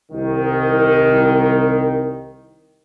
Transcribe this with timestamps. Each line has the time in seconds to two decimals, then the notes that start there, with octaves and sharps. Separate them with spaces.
0.12 C2 D#3